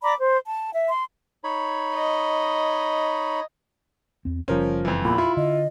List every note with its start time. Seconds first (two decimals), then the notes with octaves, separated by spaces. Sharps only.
0.03 D5 A#5 B5 D6
0.20 C5
0.46 A5
0.73 E5
0.90 C6
1.44 D#4 C#5 B5
1.95 D#5
4.25 E2 C4
4.48 F#1 C#3 F3 G3 C#4 A#4 C5
4.85 F2 E3
5.05 E2 A#2 B5
5.18 E4 F4
5.37 D3 D#5